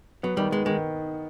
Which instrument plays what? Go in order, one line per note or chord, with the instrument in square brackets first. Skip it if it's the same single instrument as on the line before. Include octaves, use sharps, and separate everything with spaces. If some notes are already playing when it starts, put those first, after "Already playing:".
[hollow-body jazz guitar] F#3 [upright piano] B3
[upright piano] D#3 [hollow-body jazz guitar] G3
[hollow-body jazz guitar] G#3 [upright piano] B3
[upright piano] D#3 [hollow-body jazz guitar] G#3